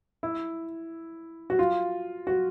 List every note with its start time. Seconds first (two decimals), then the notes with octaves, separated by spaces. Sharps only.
0.23 E4
1.50 F#4
1.59 F4
2.27 F#4